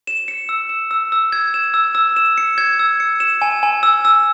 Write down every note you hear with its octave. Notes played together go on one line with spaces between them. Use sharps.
E7
C#7
E6
E7
E6
E6
G#6
E7
E6
E6
E7
C#7
G#6
E6
C#7
E7
G#5
G#5
E6
E6